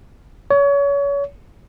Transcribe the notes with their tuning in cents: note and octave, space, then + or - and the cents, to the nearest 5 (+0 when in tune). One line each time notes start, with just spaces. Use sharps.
C#5 +30